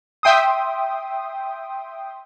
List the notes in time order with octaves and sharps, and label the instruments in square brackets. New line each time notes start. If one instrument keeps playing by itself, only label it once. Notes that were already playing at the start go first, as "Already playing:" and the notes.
[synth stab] E5 G5 C6 D#6